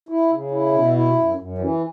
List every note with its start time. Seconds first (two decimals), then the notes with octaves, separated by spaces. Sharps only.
0.09 E4
0.31 C#3
0.51 E4
0.73 B2
0.94 E4
1.15 F#2
1.36 F#2
1.58 E3